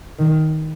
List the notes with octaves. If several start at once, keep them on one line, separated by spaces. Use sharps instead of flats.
D#3